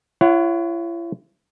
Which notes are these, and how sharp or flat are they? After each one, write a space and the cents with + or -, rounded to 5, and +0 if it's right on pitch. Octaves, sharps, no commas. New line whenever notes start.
E4 +45 C#5 +0 F#5 +0